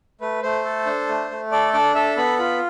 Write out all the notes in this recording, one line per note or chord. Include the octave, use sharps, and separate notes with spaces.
A3 B4
A3 C5
A4
D4
A3
A3
A4 D5
D4 D5
A4 E5
B3 B5
F4 B5